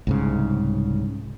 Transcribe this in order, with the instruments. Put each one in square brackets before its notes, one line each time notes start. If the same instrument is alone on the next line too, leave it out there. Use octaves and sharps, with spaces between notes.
[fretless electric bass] C2 G#2 C#3